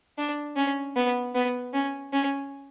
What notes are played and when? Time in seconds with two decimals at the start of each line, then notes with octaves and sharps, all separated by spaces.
0.18 D4
0.56 C#4
0.96 B3
1.35 B3
1.73 C#4
2.13 C#4